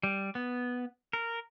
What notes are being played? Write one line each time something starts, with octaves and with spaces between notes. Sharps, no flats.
G3
B3
A#4